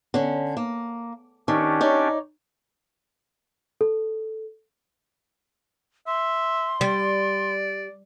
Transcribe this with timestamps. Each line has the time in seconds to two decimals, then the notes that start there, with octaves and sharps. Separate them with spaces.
0.14 D3 C#4
0.57 A#3
1.48 D#3 C#4 D4 G4
1.81 D#4 C#5 D5
3.81 A4
6.07 E5 C6
6.81 G3 D5